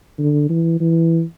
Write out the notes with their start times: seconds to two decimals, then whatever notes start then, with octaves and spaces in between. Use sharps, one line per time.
0.19 D3
0.49 E3
0.81 E3